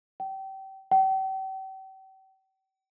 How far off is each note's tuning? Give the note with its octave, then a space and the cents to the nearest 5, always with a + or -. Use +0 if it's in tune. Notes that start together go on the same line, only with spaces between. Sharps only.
G5 -30
G5 -40